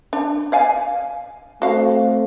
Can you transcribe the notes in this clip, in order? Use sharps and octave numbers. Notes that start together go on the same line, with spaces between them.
D4
D5 F5 G#5
A3 C4 F#4 A4 F5